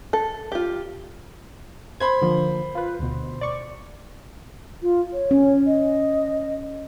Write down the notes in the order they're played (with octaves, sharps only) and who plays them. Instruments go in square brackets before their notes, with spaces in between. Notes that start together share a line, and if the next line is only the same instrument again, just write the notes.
[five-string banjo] A4
F4 G4
[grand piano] C5 B5 [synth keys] G#6
[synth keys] D3 F3 A#3
F4 B4
D2 B2
D5 C#6
[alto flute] F4
C#5
[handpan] C#4
[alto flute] D#5